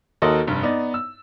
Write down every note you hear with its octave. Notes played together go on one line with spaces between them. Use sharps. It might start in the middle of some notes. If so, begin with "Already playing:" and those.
D#2 F#4 A4 A#4 D#5 C6
F1 G2
B3 D#4 D5
E6